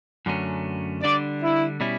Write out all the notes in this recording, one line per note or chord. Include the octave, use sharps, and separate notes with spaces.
F#2 D3 F#3 A3 C#4
D3 G3 D4 D5
E4
B2 G3 C#4 E4